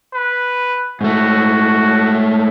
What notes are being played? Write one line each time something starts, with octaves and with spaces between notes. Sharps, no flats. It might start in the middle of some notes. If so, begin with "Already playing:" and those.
B4
G#2 A3 F#4